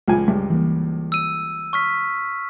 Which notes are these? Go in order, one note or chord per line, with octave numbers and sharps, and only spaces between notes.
C#2 F3 G#5
C#2 G2
E3 A#3
E6 D#7
C#6 F6 B6